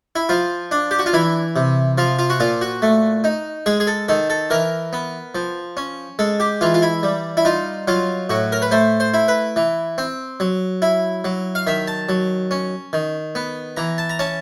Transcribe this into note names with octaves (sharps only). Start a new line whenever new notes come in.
E4
F3 F4
D4
G4
F#4
F4
E3 E4
C3
F3 F4
F4
F#4
A#2 F4
F#4
A3
D#4
G#3 G#4
G#4
A4
D#3 A4
A4
E3 A#4
B3
F3
C#4
G#3 A4
G4
E3 F4
F4
E4
G3
E4
D#4 F4
F#3 F4
A2 F#4
A#4
B4
A3 C5
C5
E4
B4
E3
C4
F#3
E4
F#3
F5
D#3 E5
A5
F#3
C#4
D#3
B3
E3 A#5
A5
A#5
C#4 A5